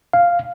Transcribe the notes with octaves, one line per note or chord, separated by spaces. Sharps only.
F5